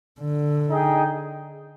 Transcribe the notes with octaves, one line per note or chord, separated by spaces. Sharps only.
D3
D#4 G#4 D#5 G5